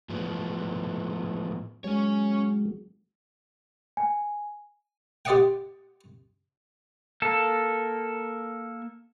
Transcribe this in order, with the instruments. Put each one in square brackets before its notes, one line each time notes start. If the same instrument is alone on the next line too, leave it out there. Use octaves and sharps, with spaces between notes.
[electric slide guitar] A2 F3 B3
[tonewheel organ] F#3 G#3 [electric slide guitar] C#4 C#5
[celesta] G#5
[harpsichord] G4 C5 D5 D#5 F#5 G5
[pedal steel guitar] A#3 A4